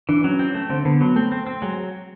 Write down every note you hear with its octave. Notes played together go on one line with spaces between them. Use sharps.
E3 D4
F#3 C#4
C4
A3
D3 C4
D3 B3
F#3 B3
A3 C4
C4
C4
F#3 G#3